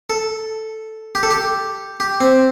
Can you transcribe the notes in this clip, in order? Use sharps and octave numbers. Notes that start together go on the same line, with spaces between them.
A4
G4
A4
G4
G4
C4